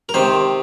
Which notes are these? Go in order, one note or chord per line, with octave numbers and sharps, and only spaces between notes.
A#4
C3 D#3 C5